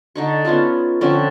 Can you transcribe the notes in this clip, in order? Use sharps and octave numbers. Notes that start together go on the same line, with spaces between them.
D3 D#4 C#6
B3 C#4 F4 A4
D3 F3 C4 C#4